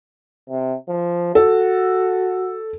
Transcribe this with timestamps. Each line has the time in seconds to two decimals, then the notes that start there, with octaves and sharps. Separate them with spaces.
0.50 C3
0.88 F3
1.35 F#4 A4